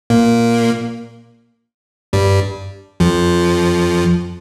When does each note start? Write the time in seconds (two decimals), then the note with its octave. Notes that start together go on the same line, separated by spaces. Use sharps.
0.10 A#2 A#3
2.13 G2 G3
3.00 F2 F3